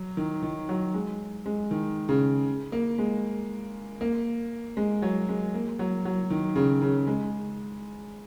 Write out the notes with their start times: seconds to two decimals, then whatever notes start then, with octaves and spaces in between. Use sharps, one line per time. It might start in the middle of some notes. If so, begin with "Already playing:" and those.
Already playing: F#3
0.17 D#3
0.43 D#3
0.69 F#3
0.94 G#3
1.46 G#3
1.71 D#3
2.09 C#3
2.72 A#3
2.98 G#3
4.01 A#3
4.77 G#3
5.02 F#3
5.29 G#3
5.54 A#3
5.79 F#3
6.05 F#3
6.30 D#3
6.56 C#3
6.82 C#3
7.07 G#3